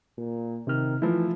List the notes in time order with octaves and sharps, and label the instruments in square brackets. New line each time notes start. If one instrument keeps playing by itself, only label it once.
[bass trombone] A#2
[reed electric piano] C3 C4 F6 [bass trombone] D#3
[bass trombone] E3 [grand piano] F3 E4 [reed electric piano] A3